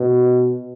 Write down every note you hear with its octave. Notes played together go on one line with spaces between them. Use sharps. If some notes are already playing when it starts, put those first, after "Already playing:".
Already playing: B2